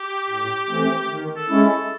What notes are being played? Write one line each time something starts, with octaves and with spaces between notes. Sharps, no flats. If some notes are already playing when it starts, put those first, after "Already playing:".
Already playing: G4
A2
E3 A3 C4
D#3
A4
G#3 C#4 E4
A4